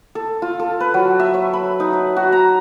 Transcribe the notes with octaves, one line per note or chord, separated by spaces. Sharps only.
A4
F4
A4
B4
F#3
E5
C#5
B5
D#4
E5
F#4
A#5